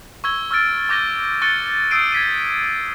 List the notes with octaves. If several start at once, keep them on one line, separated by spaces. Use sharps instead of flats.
C#6 E6 G#6 G7
C#6 E6 F6 G#6 A6 D7
C#6 D6 G6 A#6 D#7 G7
C#6 F#6 A6 C#7 D#7 G7
D#6 E6 G6 C7 D7 D#7
G#6 B6 D#7